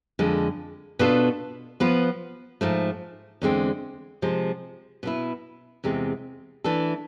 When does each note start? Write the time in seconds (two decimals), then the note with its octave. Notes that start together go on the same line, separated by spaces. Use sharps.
0.19 F2 D3 G#3
0.99 B2 B3 D4 F4 A4
1.80 F3 B3 F4 B4
2.61 G#2 F3 A3
3.42 E2 D3 G#3 C4
4.22 C3 F3 G#3
5.03 B2 B3 E4
5.84 E2 C3 G#3 C4
6.64 E3 A3 D4 A4